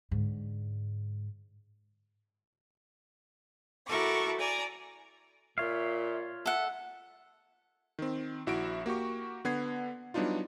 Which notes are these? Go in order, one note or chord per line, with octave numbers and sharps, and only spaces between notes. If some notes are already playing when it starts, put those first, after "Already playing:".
G#2 D3
E4 F#4 A4 A#4 C#6 D6
D5 G#5 A#5
A#2 F4 C#5 E5 F5
A4 E5 F#5
D#3 C4
A#1 E4 F#4 E5 D7
A#3 F#4 G4 C#6
D3 B3 F#5 G#6 C7
F#3 G3 B3 D4 D#4 F4